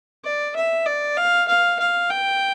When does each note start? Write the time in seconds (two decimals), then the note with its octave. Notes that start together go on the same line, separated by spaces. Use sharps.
0.24 D5
0.56 E5
0.86 D5
1.17 F5
1.48 F5
1.79 F5
2.10 G5